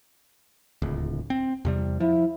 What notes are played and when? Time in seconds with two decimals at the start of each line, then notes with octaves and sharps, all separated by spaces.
0.82 D1 C#2
1.30 C4
1.65 E2 C3 G3
2.00 F3 E4